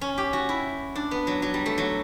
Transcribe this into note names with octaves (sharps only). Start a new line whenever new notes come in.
C#4
G4
F#4
E4
D4
B3
F#3
F#3
G3
A3
F#3